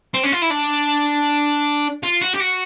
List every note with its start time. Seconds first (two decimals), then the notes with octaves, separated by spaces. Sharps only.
0.14 C4
0.23 C#4
0.32 F4
0.42 E4
0.51 D4
2.03 F4
2.21 F#4
2.34 G4
2.40 F#4